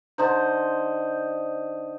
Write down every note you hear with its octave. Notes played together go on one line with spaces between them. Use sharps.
D3 D#4 C5